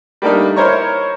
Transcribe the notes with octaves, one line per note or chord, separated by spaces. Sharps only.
G3 A3 A#3 D4 D#4
E4 A#4 C5 C#5 A#5 C#6